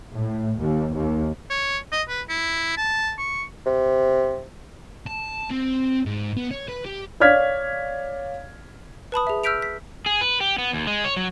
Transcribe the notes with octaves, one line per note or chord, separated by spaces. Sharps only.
A2
D#2
D#2
C#5
D#5
B4
E4
A5
C#6
C3
A5
C4
G#2
B3
C#5
B4
G4
C#5 D5 F5 F6 G#6 B6
B4 A5 B5 D#6
G#4 E5
E6 F6 G6 B6 D7 F7
B6
G#4
B4
G4
B3
D#2
G#3
C#5
F#3